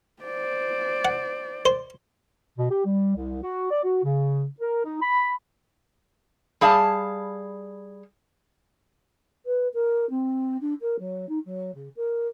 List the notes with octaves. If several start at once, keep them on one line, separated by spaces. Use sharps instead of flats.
C5 D5
F#5
C5
B2
G4
G3
C2
F#4
D5
F#4
C#3
A#4
D#4
B5
G3 G#4 F5 A5
B4
A#4
C4
D4
A#4
F#3
D#4
F#3
C#3
A#4